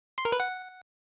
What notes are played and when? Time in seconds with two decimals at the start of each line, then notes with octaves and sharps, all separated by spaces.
0.18 C6
0.25 A#4
0.32 B4
0.40 F#5